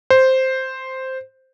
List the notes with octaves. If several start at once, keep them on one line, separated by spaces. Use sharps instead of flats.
C5